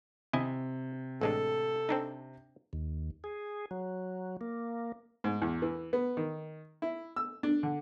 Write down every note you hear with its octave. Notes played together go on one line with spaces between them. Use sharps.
C3 E4 D#5 G#5
A1 G#3 D4 A4
C4 D4 D#4
D#2
G#4
F#3
A#3
G#2
E2
E3
B3
D#3
E4
E6
D4
D3